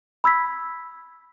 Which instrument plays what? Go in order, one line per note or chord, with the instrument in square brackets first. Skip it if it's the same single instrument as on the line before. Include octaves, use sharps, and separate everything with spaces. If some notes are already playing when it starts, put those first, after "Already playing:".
[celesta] B5 E6 G#6 B6